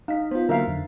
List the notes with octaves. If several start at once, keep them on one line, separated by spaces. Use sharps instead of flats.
D#4 F5 B6
B3 F4 C5
D3 F#3 A#3 A#4 E5 F5
F2 D3